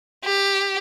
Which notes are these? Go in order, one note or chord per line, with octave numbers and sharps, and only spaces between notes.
G4